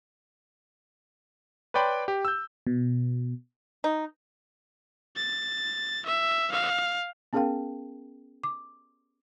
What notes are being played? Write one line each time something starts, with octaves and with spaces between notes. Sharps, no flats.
B4 C#5 D5 G5 B5 C6
G4
E6 G6
B2
D#4
A6
E5
F5
B3 C#4 G#4 A#4 F5 G5
D6